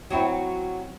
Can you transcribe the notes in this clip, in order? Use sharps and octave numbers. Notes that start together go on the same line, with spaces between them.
F#3 C4 E4